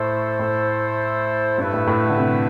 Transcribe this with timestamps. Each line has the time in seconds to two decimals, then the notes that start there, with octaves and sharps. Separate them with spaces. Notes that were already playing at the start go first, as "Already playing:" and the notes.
Already playing: A2 A3 E4 A4 C5
0.39 A2
1.58 G2 A3 E4 B4
1.73 A2
1.87 A2
2.09 D3
2.17 C3